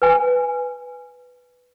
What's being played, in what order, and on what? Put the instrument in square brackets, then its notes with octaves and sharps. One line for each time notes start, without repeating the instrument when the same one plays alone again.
[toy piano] B4 G#5